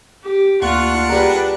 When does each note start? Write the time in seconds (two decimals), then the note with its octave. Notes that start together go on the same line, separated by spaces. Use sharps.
0.24 G4
0.62 D2 A#3 D4 F4 F#5 C#6
1.09 G3 G#4 A#4 B4